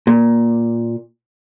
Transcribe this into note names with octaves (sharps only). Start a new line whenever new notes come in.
A#2